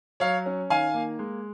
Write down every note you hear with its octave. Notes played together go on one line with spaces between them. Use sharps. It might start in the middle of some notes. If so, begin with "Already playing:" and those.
F#3 C#5 F5
C#4
D#3 F5 G#5
A#3
G#3